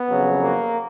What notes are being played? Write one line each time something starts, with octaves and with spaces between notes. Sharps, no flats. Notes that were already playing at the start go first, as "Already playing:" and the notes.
Already playing: B3
F2 C#3 F#3
A#3